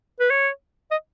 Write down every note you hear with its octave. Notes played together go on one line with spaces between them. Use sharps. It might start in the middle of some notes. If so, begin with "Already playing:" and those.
B4
C#5
D#5